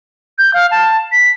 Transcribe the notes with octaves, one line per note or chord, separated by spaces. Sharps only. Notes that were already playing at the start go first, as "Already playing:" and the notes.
G6
F5
A5
B6